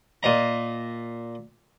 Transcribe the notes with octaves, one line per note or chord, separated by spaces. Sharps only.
A#2 D#5 A#5